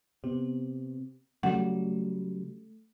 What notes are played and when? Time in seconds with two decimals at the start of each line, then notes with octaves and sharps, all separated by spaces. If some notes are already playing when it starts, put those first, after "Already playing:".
0.24 C3 B3
1.43 C#3 F#3 G3 A3 F#5